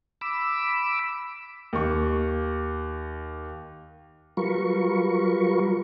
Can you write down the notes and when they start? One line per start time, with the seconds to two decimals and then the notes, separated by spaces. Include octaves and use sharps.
0.21 B5 D6 E6
1.73 D#2 C#6
4.37 F#3 G3 F4 A#4 B4 C#6